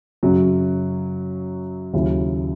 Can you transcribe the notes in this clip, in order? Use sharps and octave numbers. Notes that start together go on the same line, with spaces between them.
F#2 C#3 F#3
D#2 C#3 F#3 C#4 E4